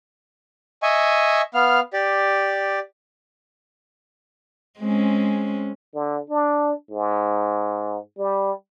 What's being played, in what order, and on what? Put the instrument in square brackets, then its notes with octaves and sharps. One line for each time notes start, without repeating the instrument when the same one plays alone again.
[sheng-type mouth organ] D#5 E5 G#5 C#6
B3 F5 F6
G4 D5
[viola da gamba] G#3 C4 C#4
[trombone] D3
D4
G#2
G3